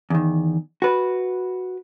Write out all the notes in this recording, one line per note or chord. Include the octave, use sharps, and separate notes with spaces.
E2 D#3
F#4 B4